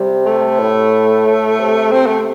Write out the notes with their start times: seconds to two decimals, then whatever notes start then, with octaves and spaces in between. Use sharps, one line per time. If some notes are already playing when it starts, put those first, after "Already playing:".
Already playing: C3 G3
0.26 A3
0.59 A2
1.26 A2
1.59 C3
1.92 C3 C4
2.07 A3